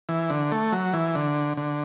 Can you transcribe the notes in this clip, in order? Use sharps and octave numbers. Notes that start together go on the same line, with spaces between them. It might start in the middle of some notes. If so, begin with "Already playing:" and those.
E3
D3
A3
F#3
E3
D3
D3